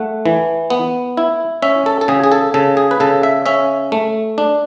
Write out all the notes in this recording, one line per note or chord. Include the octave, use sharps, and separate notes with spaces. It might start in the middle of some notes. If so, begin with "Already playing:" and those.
Already playing: A3 F#5
E3
B3
E4
C#4 E5
A4
A4
C#3 G#4
G#4
A4
C#3 A4
G#4
B4
C#3 A4
E5
C#4 E5
A3
D4